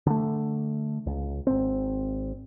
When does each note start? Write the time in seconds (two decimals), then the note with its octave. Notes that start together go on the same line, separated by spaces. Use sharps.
0.06 D3 A3
1.06 C#2
1.47 G#1 C4